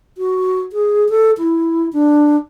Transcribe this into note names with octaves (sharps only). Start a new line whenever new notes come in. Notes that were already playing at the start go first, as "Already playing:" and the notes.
F#4
G#4
A4
E4
D4